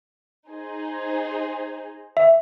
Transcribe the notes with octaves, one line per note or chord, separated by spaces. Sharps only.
D#4 G#4 C5
E5